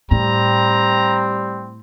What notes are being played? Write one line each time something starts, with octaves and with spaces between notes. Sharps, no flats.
A2 G3 C4 A#5